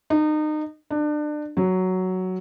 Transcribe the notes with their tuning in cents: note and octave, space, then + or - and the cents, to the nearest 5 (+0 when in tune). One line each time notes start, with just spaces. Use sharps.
D#4 -30
D4 +30
F#3 +5